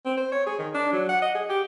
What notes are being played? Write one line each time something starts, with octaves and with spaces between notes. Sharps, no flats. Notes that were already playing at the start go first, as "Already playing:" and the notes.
C4
C5
C#5
G#4
D#3
D4
F#3
F#5
D#5
G#4
G4